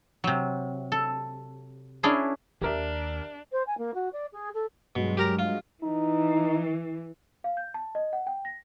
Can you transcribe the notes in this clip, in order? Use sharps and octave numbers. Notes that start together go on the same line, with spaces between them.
C3 F#3
A4
C#4 D4 E4 G#4 A#4
D#2 D4 G4 A#4 E5
C5
G#5
A#3
F#4
D5
G#4
A4
G2 B2 F#3 G#3
G4 A#4 A#5
F4
E3 D#4
F5
G6
A5
D#5
F#5
G5
A#6